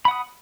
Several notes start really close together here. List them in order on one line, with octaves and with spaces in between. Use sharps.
B5 F#5 D#6